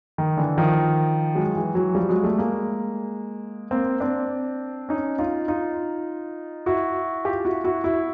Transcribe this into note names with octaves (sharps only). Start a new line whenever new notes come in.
D#3
D3 E3
D#3 F3
F#3 G#3
E3 F#3
E3 F#3
F3 G3
F#3 G#3
G3 A3
G#3 A#3
A#3 C4
C4 D4
C#4 D#4
D#4 F4
D#4 F4
E4 F#4
F4 G4
E4 F#4
E4 F#4
E4 F#4